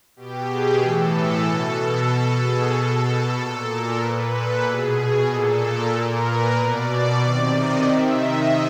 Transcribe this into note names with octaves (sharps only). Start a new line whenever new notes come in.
B2 G4
G#4
A2 E3 A4
B2
A4
B2
G#4
B2 A4
A#2
A#4
A#2 B4
A4
B2 G#4
G#4
A#2 A4
A#2 A#4
B4
B2 D5
C3 D#3
D#5
C3 D#3 E5
D#5